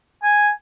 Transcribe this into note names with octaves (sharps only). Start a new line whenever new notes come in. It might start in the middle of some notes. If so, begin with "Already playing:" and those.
G#5